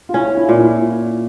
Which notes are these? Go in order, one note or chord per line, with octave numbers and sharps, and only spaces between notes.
F4
C#4 E4
E4
A#2
E4